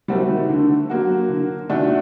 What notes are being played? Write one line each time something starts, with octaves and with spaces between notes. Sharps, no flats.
G3 A3 A#3 C4 F#4
D#3
D3
F#3 A#3 F#4
D3
A#2 D#3 A3 D4 F#4